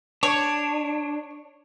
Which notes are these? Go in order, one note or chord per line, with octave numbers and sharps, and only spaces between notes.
D4 C#5